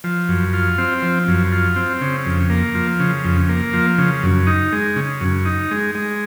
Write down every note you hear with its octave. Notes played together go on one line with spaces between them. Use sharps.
F3
F#2
F4
C4
F3
F#2
F4
C4
C#3
F2
A#3
F3
C#3
F2
A#3
F3
C#3
F#2
D#4
G#3
C#3
F#2
D#4
G#3
G#3